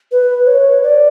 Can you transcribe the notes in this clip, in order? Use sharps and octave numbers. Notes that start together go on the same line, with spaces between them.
B4
C#5
D5